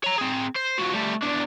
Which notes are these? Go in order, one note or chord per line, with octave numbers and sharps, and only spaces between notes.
C#5 A#5
C4 G#4
C5
F3 F#4
G3 A3
E2 D4